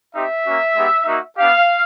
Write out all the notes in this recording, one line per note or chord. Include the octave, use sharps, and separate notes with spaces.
C4 D#4 G4 E5
A#3 C#4 F#4
G#3 B3 D#4 G4
A#3 D#4 F#4
B3 D4 G4 F5